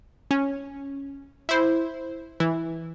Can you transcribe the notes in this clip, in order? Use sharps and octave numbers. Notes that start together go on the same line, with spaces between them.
C#4
E4 C5
E3